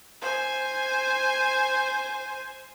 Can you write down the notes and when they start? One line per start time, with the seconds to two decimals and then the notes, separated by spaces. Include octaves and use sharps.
0.21 C5 G#5